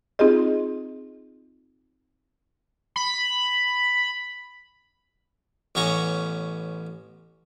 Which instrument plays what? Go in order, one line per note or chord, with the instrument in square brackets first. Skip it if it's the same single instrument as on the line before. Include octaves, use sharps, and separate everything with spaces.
[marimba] C4 D#4 F4 G4 G#4 D#5
[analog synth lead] B5
[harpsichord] A1 B3 C#4 A#5 C#6